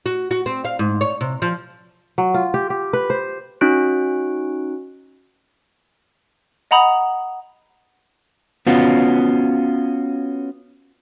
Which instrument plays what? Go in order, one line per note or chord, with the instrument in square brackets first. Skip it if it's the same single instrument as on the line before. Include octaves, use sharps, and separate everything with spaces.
[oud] F#4
F#4
C4
F5
G#2
C#5
C3
F3
[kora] F#3
F4
G4
G4
B4
C5
[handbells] C#4 D#4 F#4 F#6 D7
[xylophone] D#5 F#5 A#5 B5 D#6
[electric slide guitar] B3 C#4 F4 F#4